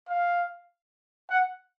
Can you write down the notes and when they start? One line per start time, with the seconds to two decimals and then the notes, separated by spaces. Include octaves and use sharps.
0.08 F5
1.29 F#5